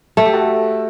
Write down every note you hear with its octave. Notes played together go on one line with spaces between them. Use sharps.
A3 A4
G4
F#4 A4